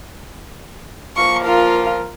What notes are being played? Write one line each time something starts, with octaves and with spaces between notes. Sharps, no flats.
F3 A#3 C#6
F4 A#4